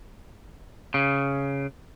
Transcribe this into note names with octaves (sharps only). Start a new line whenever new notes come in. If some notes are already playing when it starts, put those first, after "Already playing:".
C#3